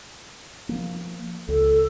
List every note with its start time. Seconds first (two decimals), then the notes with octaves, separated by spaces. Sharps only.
0.69 F3 A#3
1.48 C#2 A4